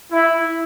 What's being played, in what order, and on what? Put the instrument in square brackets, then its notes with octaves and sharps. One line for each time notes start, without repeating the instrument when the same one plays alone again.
[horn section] E4